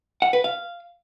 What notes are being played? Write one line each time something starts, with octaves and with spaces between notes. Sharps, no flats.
F#5
B4
F5